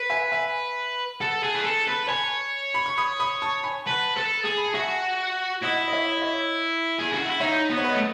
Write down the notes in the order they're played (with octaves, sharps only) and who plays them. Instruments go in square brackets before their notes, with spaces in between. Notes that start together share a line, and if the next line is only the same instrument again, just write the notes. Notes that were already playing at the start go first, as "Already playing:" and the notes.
Already playing: [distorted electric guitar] B4
[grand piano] E5 G#5
E5 G#5
[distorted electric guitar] A4 [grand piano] F#5 A5
[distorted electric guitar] G#4
B4
A4
B4
[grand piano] A5
[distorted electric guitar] C#5 [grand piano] G#5 B5
[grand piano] B5
C#6
B5 D#6
B5 D#6
A5 C#6
G#5 B5
[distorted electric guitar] B4 [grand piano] F#5 A5
[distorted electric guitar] A4
G#4
[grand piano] B5
A5
[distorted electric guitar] F#4 [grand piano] E5 G#5
[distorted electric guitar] E4 [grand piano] D#5 F#5
[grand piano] D#5
C#5 E5
D#5
C#5 E5
[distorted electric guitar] G#4
F#4
E4
[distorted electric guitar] D#4 [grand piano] C#5 E5
[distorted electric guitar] B3
[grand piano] C#5
B4 D#5
[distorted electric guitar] A3